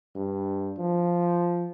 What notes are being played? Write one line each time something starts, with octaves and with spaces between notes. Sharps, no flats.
G2
F3